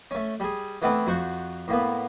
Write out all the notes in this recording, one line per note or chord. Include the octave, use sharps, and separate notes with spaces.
A3 C#4
G3 G#4
E3 A3 B3 C4 E4
F2 F#4 C5 C#6
A2 A#3 B3